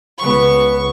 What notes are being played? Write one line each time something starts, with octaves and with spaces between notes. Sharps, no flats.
C#2 B3 C#6